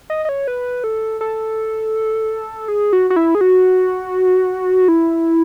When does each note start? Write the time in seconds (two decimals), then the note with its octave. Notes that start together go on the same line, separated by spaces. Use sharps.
0.10 D#5
0.25 D#5
0.29 C#5
0.48 B4
0.84 A4
1.21 A4
2.68 G#4
2.93 F#4
3.10 F#4
3.16 E4
3.35 G#4
3.41 F#4
4.88 E4